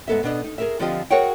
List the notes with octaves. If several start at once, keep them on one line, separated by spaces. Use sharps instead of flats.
G#2 G3 B3 A4 D#5 E5
B2 B3 D4 D#5
D#4
G#4 A#4 E5
D3 F3 C4 F4 G4 D#5
F#4 G#4 A#4 C#5 F#5 G5